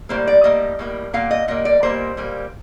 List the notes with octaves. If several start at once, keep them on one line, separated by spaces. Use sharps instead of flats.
A2 G3 A#3 C5
D5
A2 G3 A#3 D#5
A2 G3 A#3
A#2 G3 A#3 F5
D#5
A#2 G3 A#3 D#5
D5
A#2 G3 A#3 C5
A#2 G3 A#3